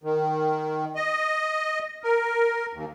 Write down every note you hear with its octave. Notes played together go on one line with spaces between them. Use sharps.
D#3
D#5
A#4
D#2